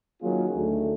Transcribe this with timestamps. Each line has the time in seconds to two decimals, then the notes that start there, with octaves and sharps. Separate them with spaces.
0.21 D#3 F#3 A#3 C#4 F4 G#4
0.53 D2 D#3 A3